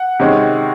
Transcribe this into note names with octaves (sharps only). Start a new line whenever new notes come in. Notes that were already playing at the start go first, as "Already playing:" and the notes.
Already playing: F#5
C3 D#3 G#3 C#4